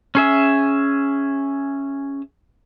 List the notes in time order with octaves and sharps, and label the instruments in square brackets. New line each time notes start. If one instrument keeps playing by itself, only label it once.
[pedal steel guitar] C#4 G#4 E5